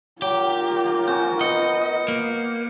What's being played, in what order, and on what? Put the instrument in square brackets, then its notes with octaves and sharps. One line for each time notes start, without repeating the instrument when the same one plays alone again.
[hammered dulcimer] F#3 [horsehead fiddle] F4 A#4 [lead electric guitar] G4
[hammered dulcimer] C4 F#4 G#5 [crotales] G6
[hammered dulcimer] B3 [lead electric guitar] D#5 [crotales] C#7
[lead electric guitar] A#3